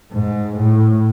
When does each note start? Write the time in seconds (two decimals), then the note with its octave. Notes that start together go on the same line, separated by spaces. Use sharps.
0.13 G#2
0.57 A2